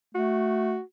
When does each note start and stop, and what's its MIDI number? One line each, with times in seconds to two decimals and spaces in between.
0.15 0.78 57
0.15 0.81 66